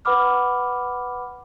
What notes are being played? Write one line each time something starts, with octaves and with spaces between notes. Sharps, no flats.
B4 F#5 B5 D6 F6